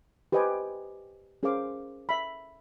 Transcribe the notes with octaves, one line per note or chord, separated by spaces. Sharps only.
G4 B4 C5 D#5 G5 G#5
C#4 G#4 A#4 C5 F5 D6
E5 B5